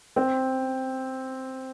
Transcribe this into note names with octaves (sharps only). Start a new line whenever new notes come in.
C4